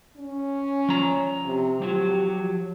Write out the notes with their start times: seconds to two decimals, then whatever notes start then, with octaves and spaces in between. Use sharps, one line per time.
0.17 C#4
0.88 F3 A#5
1.46 C3
1.82 F3 F#3 G4